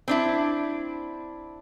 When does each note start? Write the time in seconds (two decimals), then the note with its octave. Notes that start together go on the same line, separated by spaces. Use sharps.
0.08 C4 D4 E4